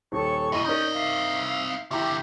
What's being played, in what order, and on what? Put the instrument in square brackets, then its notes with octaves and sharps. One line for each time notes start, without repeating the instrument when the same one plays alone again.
[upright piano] D#1 [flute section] A4 C#5 C#6
[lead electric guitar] F#2 B2 [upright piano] E4 A#5 D#7 [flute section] D#5
[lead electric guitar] C4 D#5 [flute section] C#4 D5 G6 [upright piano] D#4 A#4
[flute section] E5 F5
[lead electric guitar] F2 D3 [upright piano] E4 A#5 [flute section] G4 E5